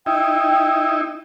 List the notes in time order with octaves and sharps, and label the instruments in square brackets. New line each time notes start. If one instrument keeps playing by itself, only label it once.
[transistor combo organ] D#4 E4 [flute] G5